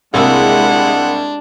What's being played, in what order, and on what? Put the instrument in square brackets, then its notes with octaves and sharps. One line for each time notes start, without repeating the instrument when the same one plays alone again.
[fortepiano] C2 A#3 E6 [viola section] G#3 E4 G#4 [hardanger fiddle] D4 [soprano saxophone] F#5